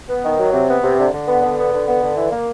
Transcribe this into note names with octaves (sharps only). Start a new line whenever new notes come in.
B3
D#3
F#3
C3
B3
C3
D3
D3
B3
D3
B3
D3
B3
D3
E3
A#3